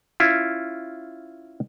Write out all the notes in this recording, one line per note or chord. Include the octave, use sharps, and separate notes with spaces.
C#4 E4 F4